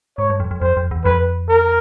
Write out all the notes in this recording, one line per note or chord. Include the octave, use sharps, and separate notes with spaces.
G#2 C#5
G2
F2
F2
F2 C5
F2
E2
F2 B4
A#4